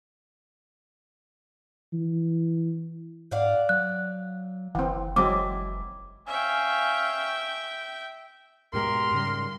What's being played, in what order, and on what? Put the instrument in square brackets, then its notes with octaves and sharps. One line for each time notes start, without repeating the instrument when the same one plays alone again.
[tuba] E3
[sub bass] G#2 [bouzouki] D5 F5 F#5
[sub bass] F#3 [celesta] F#6
[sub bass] F#1 [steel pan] E3 C4
[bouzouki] E3 [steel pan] F#3 G#3 C4 [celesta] D6
[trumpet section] C#4 F5 G#5 [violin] E5 G5
[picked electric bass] G#2 B2 G#3 [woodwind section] G4 A#4 [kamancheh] C6
[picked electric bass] G#2 C#3 G3